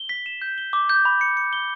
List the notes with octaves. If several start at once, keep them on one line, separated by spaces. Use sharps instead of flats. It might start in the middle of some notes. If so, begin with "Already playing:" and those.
Already playing: G7
B6
E7
G6
G7
D6
G6
B5
C#7
C#7
G7